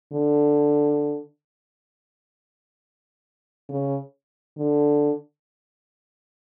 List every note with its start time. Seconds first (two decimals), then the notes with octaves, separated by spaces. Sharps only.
0.13 D3
3.69 C#3
4.58 D3